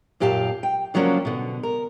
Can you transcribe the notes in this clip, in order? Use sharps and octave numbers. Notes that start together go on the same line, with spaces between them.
F#2 A#2 G4 F5 A5
G5
C#3 F3 F#3 A#3 C#4 D4
B2 D3
A#4